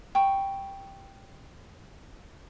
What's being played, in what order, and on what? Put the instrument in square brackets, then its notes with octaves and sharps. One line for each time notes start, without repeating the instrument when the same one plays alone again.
[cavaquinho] G5 B5 C#6